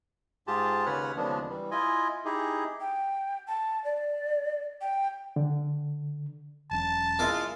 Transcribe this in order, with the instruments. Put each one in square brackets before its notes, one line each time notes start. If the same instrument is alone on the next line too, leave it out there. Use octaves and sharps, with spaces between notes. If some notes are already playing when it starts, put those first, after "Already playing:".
[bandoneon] G#2 F4 G4 G#4 A5
D#2 C#3 B4 C#5 F#5 F6
D#2 C#3 F3 G#3 B3 D4
E3 G3
E4 F4 D#5 G#5
D#4 E4 G4 G#4
[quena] G5
A5
D5
G5
[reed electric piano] D3
[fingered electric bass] E1 F#3 C#4 [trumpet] A5
[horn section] G#3 F4 [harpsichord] E4 A#4 D5